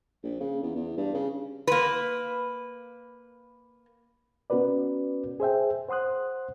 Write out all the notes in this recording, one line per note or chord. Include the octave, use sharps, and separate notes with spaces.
A#1
C#3
E2
E2
G2
C#3
A#3 B4
B3 C#4 F#4 A#4 B4 D5
G#4 C5 E5 G5
C5 F#5 C6 D#6 F#6